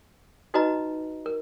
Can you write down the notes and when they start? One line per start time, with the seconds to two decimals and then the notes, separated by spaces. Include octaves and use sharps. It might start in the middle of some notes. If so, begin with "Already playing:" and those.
0.54 D#4 F#4 B4 D#5 A#5
1.26 A#4